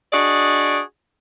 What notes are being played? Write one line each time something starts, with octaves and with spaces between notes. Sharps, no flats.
D4 F#4 G#4 D5 D#5